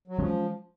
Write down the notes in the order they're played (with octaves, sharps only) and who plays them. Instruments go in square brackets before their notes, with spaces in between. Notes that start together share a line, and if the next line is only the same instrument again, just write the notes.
[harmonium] F#3
[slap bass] E3 G#3 C#4 [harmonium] F3